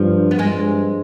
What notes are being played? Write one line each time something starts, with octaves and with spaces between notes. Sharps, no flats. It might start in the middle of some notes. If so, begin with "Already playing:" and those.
Already playing: G2 F3
B3
G2 G#3 C4